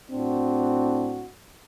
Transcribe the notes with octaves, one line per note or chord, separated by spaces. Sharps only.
A2 C4 D4 F#4